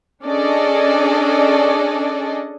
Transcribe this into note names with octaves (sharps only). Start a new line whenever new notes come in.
C#4 D4 G#4 A4 D5 D#5